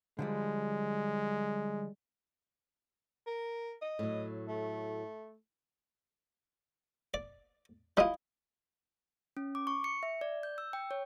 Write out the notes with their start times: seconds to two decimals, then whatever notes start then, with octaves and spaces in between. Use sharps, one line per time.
0.19 D3 F3 G3 G#3
3.27 A#4
3.81 D#5
3.99 A2 F#3
4.48 A3
7.14 D5
7.97 G3 E4 F4 D#5
9.37 C#4
9.55 D6
9.67 C#6
9.84 C#7
10.03 E5
10.21 D5
10.43 G6
10.58 E6
10.73 G5
10.91 C#5